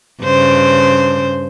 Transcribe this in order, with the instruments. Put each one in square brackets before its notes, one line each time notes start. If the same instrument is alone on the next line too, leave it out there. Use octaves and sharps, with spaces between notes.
[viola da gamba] G2 C#3 C5